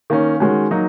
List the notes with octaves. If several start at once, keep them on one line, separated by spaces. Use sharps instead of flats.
D#3 A#3 C#4
D#3 G#3 C#4 F#4
F#3 A#3 D#4